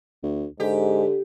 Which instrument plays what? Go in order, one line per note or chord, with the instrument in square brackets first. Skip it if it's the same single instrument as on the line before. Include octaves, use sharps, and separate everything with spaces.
[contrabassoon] D2
[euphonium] G#2 [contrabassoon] D3 [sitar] G4